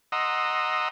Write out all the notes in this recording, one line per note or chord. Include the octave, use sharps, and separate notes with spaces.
D#5 F#5 A#5 C6 D#6 E6